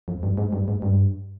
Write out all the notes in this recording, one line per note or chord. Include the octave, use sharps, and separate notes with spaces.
F2
G2
G#2
G2
G#2
G2